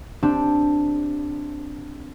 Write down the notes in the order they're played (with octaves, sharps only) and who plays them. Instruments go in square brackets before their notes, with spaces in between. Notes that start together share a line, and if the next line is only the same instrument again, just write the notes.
[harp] C4 D4 G4